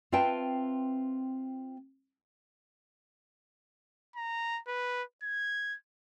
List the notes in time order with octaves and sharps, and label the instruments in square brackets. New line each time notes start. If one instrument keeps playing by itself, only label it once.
[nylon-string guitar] C4 F4 B4 E5 G5 A5
[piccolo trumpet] A#5
B4
G#6